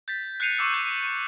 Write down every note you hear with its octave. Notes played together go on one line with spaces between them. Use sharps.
G6 A6 B6
F#6 G6 C7 C#7 D#7 F7
C#6 D6 E6 C#7
G6